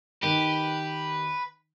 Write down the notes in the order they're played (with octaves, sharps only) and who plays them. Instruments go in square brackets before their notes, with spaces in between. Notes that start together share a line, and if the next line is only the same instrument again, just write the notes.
[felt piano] D#3 [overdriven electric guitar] G4 [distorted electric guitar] B4